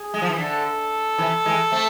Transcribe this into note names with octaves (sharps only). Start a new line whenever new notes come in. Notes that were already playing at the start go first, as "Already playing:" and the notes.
Already playing: G#4
G#3
F3
E3
D3 A4
C3 E3
E3 G#3
A3 C4